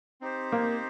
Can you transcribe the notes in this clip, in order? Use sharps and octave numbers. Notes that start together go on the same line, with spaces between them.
C4 D#4 G4 C5
A#3